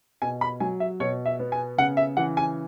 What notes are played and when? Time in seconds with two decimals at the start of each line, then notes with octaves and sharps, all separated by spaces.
0.22 B2 G#5
0.41 B5
0.60 F#3 G#5
0.80 E5
1.00 B2 C#5
1.26 E5
1.39 B3
1.52 G#5
1.78 C#3 F#5
1.97 E5
2.17 E3 F#5
2.37 G#5